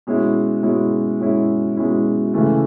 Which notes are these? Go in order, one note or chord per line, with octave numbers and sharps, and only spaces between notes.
B2 G#3 C#4 E4
B2 G#3 C#4 E4
B2 G#3 C#4 E4
B2 G#3 C#4 E4
C#3 E3 A3